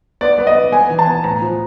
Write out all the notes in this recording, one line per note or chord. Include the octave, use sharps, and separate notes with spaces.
B3 D5
B3
D#5
B3
B3 G#5
E3
A5
B3
A2 A#5
F3